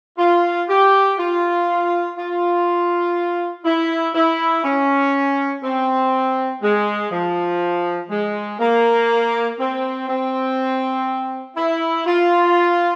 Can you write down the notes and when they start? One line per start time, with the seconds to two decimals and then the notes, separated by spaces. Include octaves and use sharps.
0.18 F4
0.69 G4
1.18 F4
2.17 F4
3.64 E4
4.15 E4
4.64 C#4
5.63 C4
6.62 G#3
7.11 F3
8.10 G#3
8.59 A#3
9.59 C4
10.07 C4
11.56 E4
12.05 F4